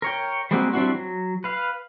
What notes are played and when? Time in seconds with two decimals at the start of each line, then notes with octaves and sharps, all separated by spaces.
0.02 A#4 C#5 G5
0.51 G3 G#3 A#3 C4 F#4
0.73 G3 C4 D4 E4 F#4
0.95 F#3
1.44 B4 F5